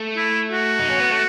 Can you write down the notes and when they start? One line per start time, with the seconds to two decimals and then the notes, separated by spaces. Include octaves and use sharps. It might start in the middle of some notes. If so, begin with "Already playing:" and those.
Already playing: A3
0.17 E4
0.52 F#4
0.79 D#4
0.90 C#4
1.00 B3
1.10 A3